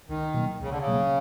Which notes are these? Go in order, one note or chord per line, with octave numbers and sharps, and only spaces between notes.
C#2 D#3
B2 F#3 A#3
C#2 C#3
D3
C#3
B2 F#3 A#3